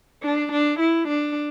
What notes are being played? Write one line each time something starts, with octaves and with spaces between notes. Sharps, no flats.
D4
D4
E4
D4